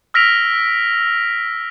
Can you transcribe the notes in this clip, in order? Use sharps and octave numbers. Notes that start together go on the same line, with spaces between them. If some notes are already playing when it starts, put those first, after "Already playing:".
E6 F6 A#6 B6 D7 F7